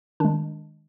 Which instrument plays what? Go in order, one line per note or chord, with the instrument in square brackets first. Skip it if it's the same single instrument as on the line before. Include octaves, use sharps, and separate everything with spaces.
[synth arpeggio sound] D#3 G#3 D4